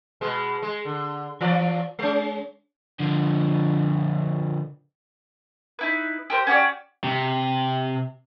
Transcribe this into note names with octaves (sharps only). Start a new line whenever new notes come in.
B2 G#3
G#3
D3
E3 F3 D5
G#3 C#4
D3 F3
D#4 E4 B4
G4 A#4 C5
C#4 F#4 G4 D5
C3